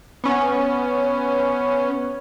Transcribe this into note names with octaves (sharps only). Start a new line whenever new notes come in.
B3 C#4